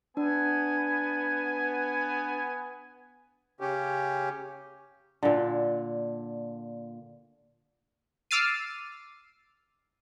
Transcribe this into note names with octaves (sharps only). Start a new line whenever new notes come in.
B3 D4 G#5
C#3 C#4 G4
A#2 D3
D6 E6 F6 A6 C7 D#7